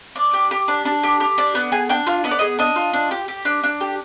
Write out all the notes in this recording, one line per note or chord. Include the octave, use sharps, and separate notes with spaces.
D4 D5
G4
G4
D4
D4
G4
G4
D4
B3
G#4 G#5
D4 G5
F4 F5
B3 D#5
D5
G#4 D#5
D4 D#5
F4
D4
G4
G4
D4
D4
G4